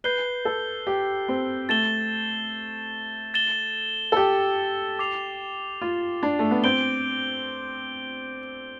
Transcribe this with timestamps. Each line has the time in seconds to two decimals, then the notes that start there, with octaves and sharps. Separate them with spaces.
0.04 B4 G6 C7 G7
0.45 A4
0.87 G4
1.29 C4
1.69 A3 A6 E7 G7
3.34 A6 E7 G7
4.12 A4
4.16 G4
4.99 D6 A6 C7 F7
5.82 F4
6.23 D4
6.39 A3
6.51 B3
6.64 C4 G6 D7 G7